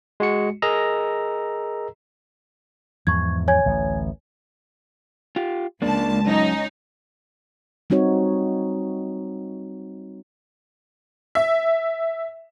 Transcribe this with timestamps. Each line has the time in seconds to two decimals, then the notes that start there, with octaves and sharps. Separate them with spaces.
0.20 G#3 F#4 C#7
0.62 G#4 A#4 D#5 A#5 E6
3.07 E2 G#2 F3 C#6 G#6
3.48 C#5 G#5 G#6
3.66 A1 D2
5.36 F4 G4
5.82 C#2 A#3 D4 A5
6.27 F#2 C#4 D#4
7.90 G3 C4 D#4 F#4 C#5
11.35 E5